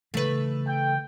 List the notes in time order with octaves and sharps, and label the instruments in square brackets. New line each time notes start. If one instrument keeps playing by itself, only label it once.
[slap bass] C#3 E3 [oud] A3 B4
[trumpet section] G5